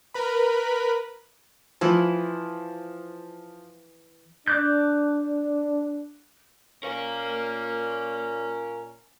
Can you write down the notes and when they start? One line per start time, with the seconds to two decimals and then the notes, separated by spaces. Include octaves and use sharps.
0.14 A#4 B4 B5
1.81 E3 F3 E4
4.48 D4 D6 F#6 G6
6.83 A#2 C#4 A#4 F5